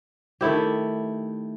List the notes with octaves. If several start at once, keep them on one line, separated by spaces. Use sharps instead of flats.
D#3 A3 E4 G4